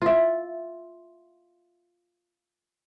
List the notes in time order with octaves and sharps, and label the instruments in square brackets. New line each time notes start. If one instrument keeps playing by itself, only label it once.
[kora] F4 E5